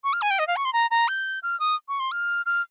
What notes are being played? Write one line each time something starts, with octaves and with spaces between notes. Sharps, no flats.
C#6
F6
G#5
G5
D#5
F5
C#6
C6
A#5
A#5
G6
F6
D#6
C#6
C6
F6
F6